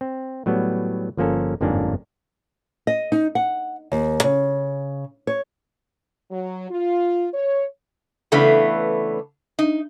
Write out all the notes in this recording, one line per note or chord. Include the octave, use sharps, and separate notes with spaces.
C4
A2 F#3 G3 B3
G1 F3 A#3 C#4 A4
G1 F2 G#2 A#3 C#4 D4
D#5
D#4
F#5
D#2
C#3
C#5
F#3
F4
C#5
C#3 E3 A3 B3 D4 B4
D#4